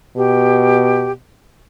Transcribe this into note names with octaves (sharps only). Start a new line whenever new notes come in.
B2 G4